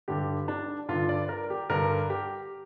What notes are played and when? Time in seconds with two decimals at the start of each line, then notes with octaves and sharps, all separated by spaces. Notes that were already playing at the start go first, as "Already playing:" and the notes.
0.08 G2 D3 G4
0.48 D4
0.88 G2 D3 F4
1.09 D5
1.29 A#4
1.50 G4
1.70 G2 D3 A#4
2.10 G4